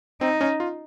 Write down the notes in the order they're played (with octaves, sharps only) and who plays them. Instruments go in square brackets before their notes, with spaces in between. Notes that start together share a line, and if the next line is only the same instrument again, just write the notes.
[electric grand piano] C4 [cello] D#4
[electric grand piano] C#4
F4